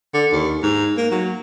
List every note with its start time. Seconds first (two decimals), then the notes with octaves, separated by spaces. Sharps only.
0.14 D3
0.32 D#2
0.63 G#2
0.97 A#3
1.11 F#3